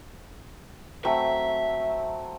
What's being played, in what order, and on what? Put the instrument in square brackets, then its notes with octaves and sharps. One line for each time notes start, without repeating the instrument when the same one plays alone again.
[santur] F#3 A3 C4 [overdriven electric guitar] E5